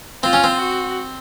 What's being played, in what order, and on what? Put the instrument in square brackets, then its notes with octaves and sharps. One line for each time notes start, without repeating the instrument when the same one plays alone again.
[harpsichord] C4 [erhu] F4
[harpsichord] C#4
C4
[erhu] F#4